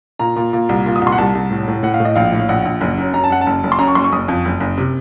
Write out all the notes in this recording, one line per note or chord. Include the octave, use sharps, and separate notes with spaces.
A#2 A#5
A#2
A#2
C2
A#2
D#6
C2
C6
F#5
C2 A5
C2
A2
A2
A2 F#5
F5
A2
D#5
A#1 F5
A2
F5
A#1 F#5
A#1
F#1
F#2
F#2 A#5
A5
F#2 F#5
A5
F#1
F#1
C6
F#2 A#5
C#6
F#1 C6
C#6
F#1 D#6
F2
F#1
F#1
C3